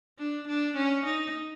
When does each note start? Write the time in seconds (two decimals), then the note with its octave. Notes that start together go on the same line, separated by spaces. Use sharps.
0.19 D4
0.48 D4
0.77 C#4
1.05 D#4